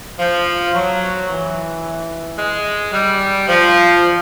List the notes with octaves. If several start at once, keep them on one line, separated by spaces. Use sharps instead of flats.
F3
F#3
E3
G#3
G3
F3